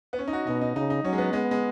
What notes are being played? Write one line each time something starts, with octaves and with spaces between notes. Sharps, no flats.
B3
C#4
D#4
F#4
B2 D#4
D#4
C#3 D#4
D#4
F#3 C#4
G#3
B3
G#3 B3
G#3